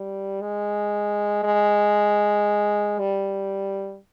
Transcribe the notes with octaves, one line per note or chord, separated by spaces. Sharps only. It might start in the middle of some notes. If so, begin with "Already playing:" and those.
Already playing: G3
G#3
G#3
G3